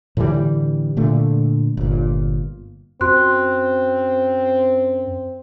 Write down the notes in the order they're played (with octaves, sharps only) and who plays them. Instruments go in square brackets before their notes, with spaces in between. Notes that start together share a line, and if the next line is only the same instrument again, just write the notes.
[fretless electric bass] A2 D3 E3 G3
A#2 D3 A3
G1 A#2
[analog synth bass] F#2 [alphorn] C4 [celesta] F#4 C6 F#6